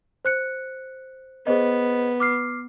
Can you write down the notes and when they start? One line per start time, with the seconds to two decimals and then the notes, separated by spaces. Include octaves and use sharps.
0.25 C5 F#6 C#7
1.47 B3 G#4 C5 D#5
2.20 D6 F6 C7